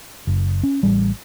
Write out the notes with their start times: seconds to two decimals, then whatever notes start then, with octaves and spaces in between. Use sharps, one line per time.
0.27 F#1
0.63 C#4
0.83 A1 G3